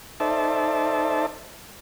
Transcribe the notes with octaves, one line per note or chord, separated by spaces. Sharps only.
D#4 A4 C5 D5 E5 A5